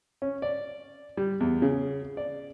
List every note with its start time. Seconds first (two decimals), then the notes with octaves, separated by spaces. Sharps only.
0.22 C#4
0.42 D5
1.17 G3
1.40 E2
1.62 C#3
2.17 D5